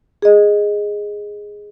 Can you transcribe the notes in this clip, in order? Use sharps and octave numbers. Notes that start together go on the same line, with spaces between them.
G#4 D#5